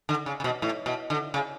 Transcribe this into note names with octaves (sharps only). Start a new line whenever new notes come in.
D3
C#3
C#3
B2
A2
B2
D3
C#3